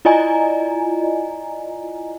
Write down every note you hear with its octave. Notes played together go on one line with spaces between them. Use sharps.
E4 F4 D5 D#5 G#5 A#5